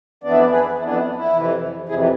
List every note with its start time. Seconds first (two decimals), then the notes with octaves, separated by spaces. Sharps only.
0.24 F2 E3 B3 D4 D5
0.32 E5
0.39 B4 D5
0.51 G#4 B4
0.78 F2 E3 B3 D4 E4
0.98 E4
1.15 E4
1.33 F2 C3 E3
1.89 F2 C3 E3 E4 G#4